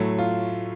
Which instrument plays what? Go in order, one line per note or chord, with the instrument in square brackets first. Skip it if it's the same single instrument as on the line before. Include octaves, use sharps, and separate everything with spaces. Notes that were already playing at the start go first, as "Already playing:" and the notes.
Already playing: [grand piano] A2 F#3 A3
F4